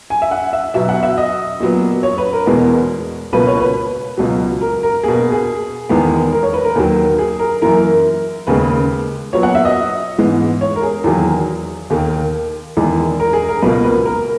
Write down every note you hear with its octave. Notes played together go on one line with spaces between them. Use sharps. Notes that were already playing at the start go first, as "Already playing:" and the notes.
G#5
E5
F#5
E5
B2 F#3 B3 E5
F#5
E5
D#5
A#2 F#3 B3
C#5
B4
A#4
E2 B2 G#3 B3
C#2 B2 A#3 B4
C#5
B4
C#2 B2 F#3
A#4
A#4
B2 A#3 G#4
G#4
E2 D#3 G#3 B3
A#4
C#5
B4
A#4
D#2 D#3 F#3
G#4
A#4
F#2 E3 A#3 A#4
D#2 C#3 G#3 B4
A#2 F#3 B3 C#5
F#5
E5
D#5
G#2 E3 G#3 B3
C#5
A#4
G#4
E2 D#3 F#3 A#3
D#2 D#3 A#3
E2 D#3 G#3
A#4
G#4
A#4
C#2 B2 A#3 B4
B4
A#4